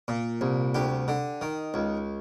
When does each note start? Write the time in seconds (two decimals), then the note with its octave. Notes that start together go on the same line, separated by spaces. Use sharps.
0.08 A#2
0.41 C2
0.75 D2 G4
1.08 D3
1.41 D#3
1.74 C#2